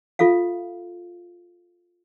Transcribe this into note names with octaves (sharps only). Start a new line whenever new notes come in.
F4 A4 E5 F5